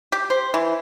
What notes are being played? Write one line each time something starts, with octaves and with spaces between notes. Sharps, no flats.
G4
C5
E3